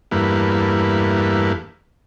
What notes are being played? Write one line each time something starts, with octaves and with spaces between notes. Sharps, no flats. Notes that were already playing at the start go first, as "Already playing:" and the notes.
E2 G2 A3 A#3 B4